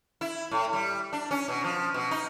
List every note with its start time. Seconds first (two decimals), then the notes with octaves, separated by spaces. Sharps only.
0.21 E4
0.51 A2
0.73 G3
1.13 D4
1.31 C#4
1.48 B2
1.64 F3
1.94 B2
2.11 D#4